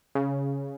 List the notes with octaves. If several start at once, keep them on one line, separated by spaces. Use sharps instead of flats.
C#3